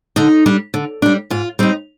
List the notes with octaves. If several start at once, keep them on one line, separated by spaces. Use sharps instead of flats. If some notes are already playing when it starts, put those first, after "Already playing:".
D3 D#4
G3 D4
D3
G3 D4
G#2 F4
G3 C4 D#4